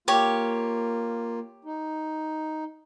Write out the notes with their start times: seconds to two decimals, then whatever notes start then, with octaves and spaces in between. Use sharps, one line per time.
0.08 A#3 F4 G4 C#5
1.65 D#4